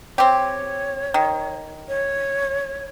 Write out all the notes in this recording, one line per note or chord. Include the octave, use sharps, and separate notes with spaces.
C4 G4 C#5
D#3
C#5